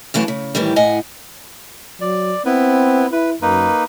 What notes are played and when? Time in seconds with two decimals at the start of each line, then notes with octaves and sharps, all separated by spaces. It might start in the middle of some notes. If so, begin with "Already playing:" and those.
0.14 F#2 E3 A3 F5 A5
0.28 C#3
0.55 A2 D#3 E3 G3
0.76 A2 D#5 F#5 G#5
2.01 F#3 D5
2.46 B3 C4 E4 B4
3.12 E4 B4
3.42 F#2 A#3 D#4 B4